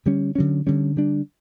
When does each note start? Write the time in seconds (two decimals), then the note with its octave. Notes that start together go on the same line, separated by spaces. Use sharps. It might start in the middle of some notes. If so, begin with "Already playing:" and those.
0.06 D3 G3 C#4
0.35 D3 F#3 C#4
0.67 D3 G3 C#4
0.96 D3 G3 D4